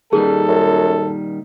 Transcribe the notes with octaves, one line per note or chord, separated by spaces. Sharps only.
A#2 D#3 G3 G#4 A4
F#2